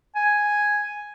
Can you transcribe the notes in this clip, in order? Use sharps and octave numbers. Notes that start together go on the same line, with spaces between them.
G#5